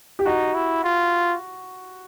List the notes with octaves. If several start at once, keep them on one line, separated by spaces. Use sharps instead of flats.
G4
D#4 F#4
E4
F4